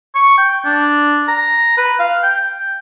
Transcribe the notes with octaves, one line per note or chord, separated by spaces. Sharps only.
C#6
G5
D4
A#5
B4
F5
G5